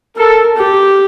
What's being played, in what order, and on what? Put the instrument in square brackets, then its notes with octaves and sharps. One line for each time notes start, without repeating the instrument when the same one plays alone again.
[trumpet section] A4 [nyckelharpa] A#4
[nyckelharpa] G4